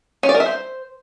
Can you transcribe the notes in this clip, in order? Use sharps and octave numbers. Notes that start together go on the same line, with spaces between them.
C#4
D5
A#4
E5
C5